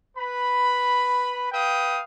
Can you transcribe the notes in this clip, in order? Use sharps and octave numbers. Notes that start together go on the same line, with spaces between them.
B4 B5
B4 F5 G5 D#6